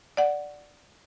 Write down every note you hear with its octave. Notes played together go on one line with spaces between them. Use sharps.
D5 F#5